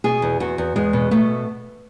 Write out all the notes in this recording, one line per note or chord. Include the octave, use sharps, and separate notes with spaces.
B2 G#4
E2
E2 F#4
E2
E2 G#3
B2
B2 A3